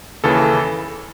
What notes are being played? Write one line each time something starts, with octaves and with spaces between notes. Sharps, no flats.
D#2 C#3 E3 A4